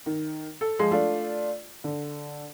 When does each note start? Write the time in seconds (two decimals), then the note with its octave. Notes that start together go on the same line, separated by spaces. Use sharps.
0.06 D#3
0.61 A4
0.79 F3 G#3
0.91 A3 D4 F4
1.84 D3